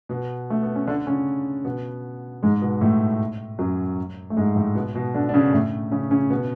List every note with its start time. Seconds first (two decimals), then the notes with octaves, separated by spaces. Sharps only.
0.09 B2 B3
0.50 A3
0.63 B3
0.76 C#4
0.87 D3 D4
1.07 C#3 C#4
1.65 B2 B3
2.43 G#2 G#3
2.62 B2 B3
2.81 A2 A3
3.59 F#2 F#3
4.30 A3
4.37 G#2 G#3
4.56 A2 A3
4.75 B2 B3
4.95 B2 B3
5.14 D3 D4
5.29 D4
5.34 C#3 C#4
5.53 A2 A3
5.92 C#3 C#4
6.11 C#3 C#4
6.30 B2 B3